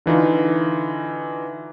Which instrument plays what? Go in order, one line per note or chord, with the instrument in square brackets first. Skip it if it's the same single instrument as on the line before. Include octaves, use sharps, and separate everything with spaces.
[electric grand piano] D3 E3 D#4 F4